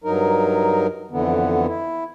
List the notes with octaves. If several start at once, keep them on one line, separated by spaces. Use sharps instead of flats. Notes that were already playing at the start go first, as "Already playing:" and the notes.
G2 F#3 D#4 A#4
F2 D3 E3 B3
E4